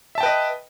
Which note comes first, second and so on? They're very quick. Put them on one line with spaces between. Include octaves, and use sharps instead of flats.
E5 A5 G5 B4 D#5